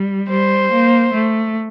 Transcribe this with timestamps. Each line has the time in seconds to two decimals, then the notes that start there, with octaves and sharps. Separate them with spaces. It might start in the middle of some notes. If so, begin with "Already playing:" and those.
Already playing: G3
0.30 G3 C5
0.72 A#3
1.13 A3